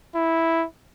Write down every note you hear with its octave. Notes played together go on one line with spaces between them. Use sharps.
E4